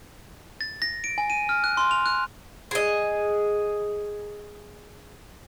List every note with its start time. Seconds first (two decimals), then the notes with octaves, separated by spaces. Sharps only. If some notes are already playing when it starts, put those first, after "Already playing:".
0.61 A6
0.82 A#6
1.04 D7
1.18 G#5
1.30 D#7
1.49 F6
1.64 F#6
1.77 C6
1.91 F7
2.06 F#6
2.71 G#4 D#5